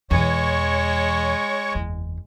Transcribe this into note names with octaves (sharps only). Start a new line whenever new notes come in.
E2 B2 G#3 C#5 C#6
F#1 E2